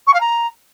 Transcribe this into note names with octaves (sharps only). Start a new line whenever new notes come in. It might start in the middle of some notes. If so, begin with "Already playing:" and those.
C#6
F5
A#5